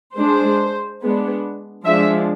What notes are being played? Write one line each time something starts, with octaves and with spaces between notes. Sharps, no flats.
G#3 D4 C5
G#3 B3 D4
F3 G#3 D4 E5